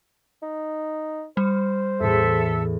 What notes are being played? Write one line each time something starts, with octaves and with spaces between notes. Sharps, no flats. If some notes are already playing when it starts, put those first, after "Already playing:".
D#4
G3 C5
E2 A2 A4 E5 E6